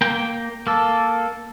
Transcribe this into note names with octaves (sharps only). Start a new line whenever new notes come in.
A#3 G5
A#3 A4